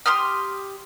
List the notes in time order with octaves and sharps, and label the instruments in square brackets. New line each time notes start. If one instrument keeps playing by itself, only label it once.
[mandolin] G4 C6 D#6 F6